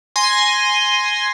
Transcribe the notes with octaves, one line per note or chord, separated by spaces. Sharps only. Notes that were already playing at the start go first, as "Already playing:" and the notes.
G#5 C6 A#6